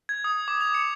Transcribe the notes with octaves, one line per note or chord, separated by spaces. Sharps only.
G#6
D#6
D6
F7
C#7